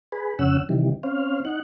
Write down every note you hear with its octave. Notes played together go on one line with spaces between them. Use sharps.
G#4 B4
F2 C#3 C#4 F#5 E6
C3 D#3 E3 G3
C4 C#4 F5
D#4 F#5